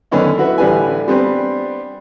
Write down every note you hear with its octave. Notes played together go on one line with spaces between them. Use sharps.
F#2 D3 D#3 B3 C#4 D#4
E4 F#4 B4 E5
A1 D3 G3 B4 G#5
G3 B3 C4 D4